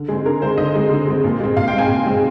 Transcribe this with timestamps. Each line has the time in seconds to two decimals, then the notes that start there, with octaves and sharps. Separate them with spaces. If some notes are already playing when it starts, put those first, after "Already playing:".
Already playing: D3
0.08 G#3 C4 G#4
0.25 D3 A#4
0.42 G#3 C4 C5
0.58 D3 D#5
0.75 G#3 C4
0.91 D3
1.07 G#3 C4
1.24 A#2
1.40 G#3 C4
1.57 A#2 F5
1.68 G5
1.73 G#3 C4 G#5
1.89 A#2
2.06 G#3 C4